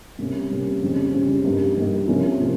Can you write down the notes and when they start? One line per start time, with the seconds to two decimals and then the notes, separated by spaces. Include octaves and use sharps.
0.19 C3 G3 A#3 C#4
0.50 C3 G3 A#3 C#4
0.82 F2 C#3 G3 C#4
1.14 F2 C#3 G3 C#4
1.44 G2 G3 A#3 D#4
1.77 G2 G3 A#3 D#4
2.08 C3 F3 A#3 C#4
2.40 C3 F3 A#3